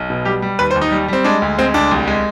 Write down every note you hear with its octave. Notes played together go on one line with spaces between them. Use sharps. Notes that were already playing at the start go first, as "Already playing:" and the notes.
Already playing: B1
B2
G3 G4
G3
D#2 B4
C5
D#2
D#4
G3
G3 C4
G#3 D4
D2
G#3 C4
D2 D4
C2
G#3